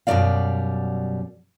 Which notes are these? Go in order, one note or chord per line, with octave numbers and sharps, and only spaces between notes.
F#2 B2 G3 A3 D5 F5